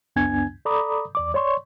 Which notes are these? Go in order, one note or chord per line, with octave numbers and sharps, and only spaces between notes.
C#2 F#2 B3 D4 G#5 G#6
A4 D5 A#5 B5 D6 D#6
E2 D5 D6
C#5 D5 C6 C#6